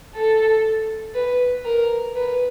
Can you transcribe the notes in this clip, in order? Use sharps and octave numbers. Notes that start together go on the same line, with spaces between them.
A4
B4
A#4
B4